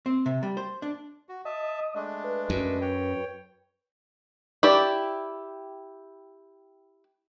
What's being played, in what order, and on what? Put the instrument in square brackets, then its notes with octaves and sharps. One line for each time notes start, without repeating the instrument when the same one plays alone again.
[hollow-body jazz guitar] C4
C3
G3
C5
D4
[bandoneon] F#4
[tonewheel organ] D#5 D#6 [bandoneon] E5 A5
[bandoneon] G#3 A3 D4
[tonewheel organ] B4
[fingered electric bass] F#2
[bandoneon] C#5 G5
[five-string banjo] E4 G4 D5